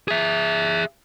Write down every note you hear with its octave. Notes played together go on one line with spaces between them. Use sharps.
G#4 E5